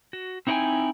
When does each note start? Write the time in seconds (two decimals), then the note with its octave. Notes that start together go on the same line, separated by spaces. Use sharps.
0.13 F#4
0.47 C4 D#4 E4 B4 G5 G#5